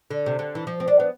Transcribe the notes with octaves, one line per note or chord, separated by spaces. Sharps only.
D3
C3
D3
E3
F3
C4
D4
B3